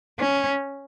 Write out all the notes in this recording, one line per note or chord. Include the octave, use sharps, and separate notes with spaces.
C#4